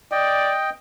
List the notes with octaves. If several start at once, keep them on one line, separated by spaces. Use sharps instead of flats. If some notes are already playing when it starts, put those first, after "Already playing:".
D5 D#5 G5